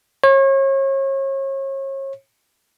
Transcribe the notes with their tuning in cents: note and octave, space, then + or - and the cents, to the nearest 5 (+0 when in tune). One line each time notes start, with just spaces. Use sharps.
C#5 -35